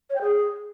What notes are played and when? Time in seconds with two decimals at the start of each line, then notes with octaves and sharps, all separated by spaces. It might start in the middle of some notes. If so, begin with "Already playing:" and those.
0.10 C#5
0.15 G5
0.21 G#4